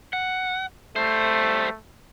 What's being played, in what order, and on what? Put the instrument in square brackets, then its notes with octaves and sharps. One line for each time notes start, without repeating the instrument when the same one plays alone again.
[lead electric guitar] F#5
[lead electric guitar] G3 C5 [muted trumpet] A3